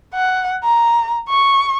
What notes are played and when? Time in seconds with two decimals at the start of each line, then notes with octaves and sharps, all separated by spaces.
0.14 F#5
0.64 A#5
1.29 C#6